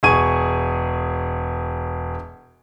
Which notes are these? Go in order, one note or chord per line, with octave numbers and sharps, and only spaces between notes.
E1 G#4 C#6 G#6 D#7